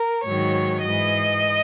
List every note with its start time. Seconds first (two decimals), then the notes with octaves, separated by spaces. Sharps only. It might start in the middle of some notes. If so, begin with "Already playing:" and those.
Already playing: A#4
0.25 G#2 D#3 F#3 C#5
0.85 G#2 E3 D#5